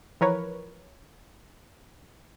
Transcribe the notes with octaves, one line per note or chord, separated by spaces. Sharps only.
E3 F3 A#4 B4 C#5